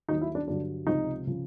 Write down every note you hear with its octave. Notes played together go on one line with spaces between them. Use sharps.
D#2 D#3 F#3 D#4
E4
D4
G2 D3 F#3 D4
C#2 C3 F3 D#4
C#3 F3